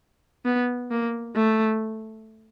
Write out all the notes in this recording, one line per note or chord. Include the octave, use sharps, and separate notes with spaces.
B3
A#3
A3